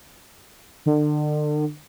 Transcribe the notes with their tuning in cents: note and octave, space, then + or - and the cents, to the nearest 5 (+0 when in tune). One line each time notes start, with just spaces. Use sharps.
D3 +35